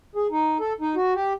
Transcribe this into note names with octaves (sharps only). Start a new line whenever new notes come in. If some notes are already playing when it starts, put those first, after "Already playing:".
G#4
D#4
A4
D#4
F#4
G4